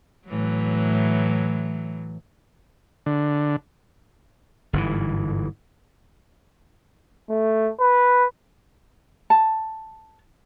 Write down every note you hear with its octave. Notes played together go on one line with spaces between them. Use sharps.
A2 E3 F#3
D3
G1 G#2 C#3 E3
A3
B4
A5